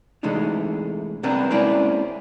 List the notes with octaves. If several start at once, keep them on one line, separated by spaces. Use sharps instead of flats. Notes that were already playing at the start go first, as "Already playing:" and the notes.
C3 E3 G#3 A3 D4 D#4
C2 B3 C4 D4 A#4
G#3 A#3 C4 C#4 E4 D5